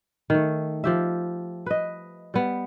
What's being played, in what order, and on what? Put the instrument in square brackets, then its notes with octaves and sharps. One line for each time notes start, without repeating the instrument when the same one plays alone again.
[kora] D#3 A3
F3 G4 E5
B4 D#5
G3 B3